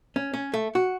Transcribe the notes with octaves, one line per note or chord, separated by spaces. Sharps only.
C#4
C#4
A3
F#4